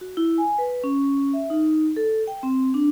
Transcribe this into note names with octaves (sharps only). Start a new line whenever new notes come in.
F#4
E4
G#5
B4
C#4
E5
D#4
A4
G5
C4
D4